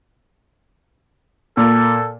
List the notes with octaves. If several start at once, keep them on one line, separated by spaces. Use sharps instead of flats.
A#2 A#3 A4